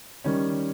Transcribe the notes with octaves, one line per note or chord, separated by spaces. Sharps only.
D#3 G3 C#4